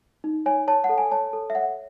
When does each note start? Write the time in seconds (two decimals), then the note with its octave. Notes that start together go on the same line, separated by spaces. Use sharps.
0.24 D#4
0.46 C#5 G#5
0.68 C#5 A5
0.84 F#5
0.89 A4
0.98 G#5
1.11 C#5 A5
1.33 A4
1.50 E5
1.55 C#5 F#5